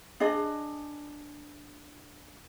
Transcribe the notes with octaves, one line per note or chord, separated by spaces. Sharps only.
D4 G#4 D#5